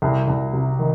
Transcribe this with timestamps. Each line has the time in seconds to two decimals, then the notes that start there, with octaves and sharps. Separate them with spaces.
0.02 C2
0.28 C2
0.53 C3
0.79 D#3